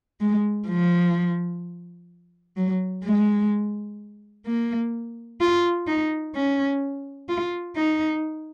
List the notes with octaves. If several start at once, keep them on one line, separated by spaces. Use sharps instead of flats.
G#3
F3
F#3
G#3
A#3
F4
D#4
C#4
F4
D#4